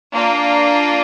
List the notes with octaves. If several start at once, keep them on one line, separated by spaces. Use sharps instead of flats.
A#3 D4 F4